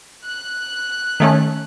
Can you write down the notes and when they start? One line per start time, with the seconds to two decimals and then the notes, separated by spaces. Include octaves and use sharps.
0.24 F#6
1.20 D#3 A3 C#4